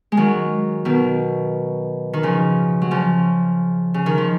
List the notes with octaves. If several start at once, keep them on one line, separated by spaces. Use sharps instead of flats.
G#3
D#3 F#3
B2 D#3
D#3
C#3 F3
F#3
C#3 F3
C#3
D#3
F3